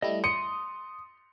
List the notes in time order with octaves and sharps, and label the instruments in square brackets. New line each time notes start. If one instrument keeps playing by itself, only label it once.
[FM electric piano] G3 A3 E4 [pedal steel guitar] D#5
[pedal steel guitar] C6 [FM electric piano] D#6 [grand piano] C#7